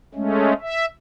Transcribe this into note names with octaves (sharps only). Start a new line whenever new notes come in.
G#3 A3 C#4
E5